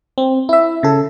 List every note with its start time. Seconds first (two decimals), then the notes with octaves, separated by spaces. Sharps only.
0.18 C4
0.49 E4 E5
0.83 C#3 A4